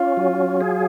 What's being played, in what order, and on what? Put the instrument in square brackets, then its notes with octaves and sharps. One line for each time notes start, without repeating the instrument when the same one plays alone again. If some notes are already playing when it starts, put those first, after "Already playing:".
Already playing: [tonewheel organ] C#4 [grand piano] F4
[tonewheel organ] F#3
G#4